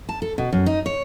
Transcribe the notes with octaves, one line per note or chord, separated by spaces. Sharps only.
A5
A4
B2
F#2
D#4
C#5